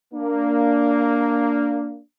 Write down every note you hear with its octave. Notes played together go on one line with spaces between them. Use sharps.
A#3 D4